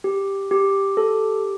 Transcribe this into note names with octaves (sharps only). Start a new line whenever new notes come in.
G4
G4
A4